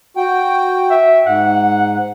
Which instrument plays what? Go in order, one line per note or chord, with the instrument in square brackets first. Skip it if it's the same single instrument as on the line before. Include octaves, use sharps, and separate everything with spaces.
[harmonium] F#4 G5
[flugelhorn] E5
[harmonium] G#2 [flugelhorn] F#5